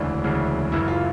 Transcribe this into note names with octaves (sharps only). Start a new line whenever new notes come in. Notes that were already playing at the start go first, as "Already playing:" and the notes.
Already playing: E1 D2 C#3 E3 D4
E1 D2 C#3 E3
F#1 F#2 C#3 E3 E4
F4